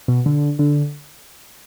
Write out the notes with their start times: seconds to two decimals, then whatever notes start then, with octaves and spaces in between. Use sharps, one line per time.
0.08 B2
0.26 D3
0.59 D3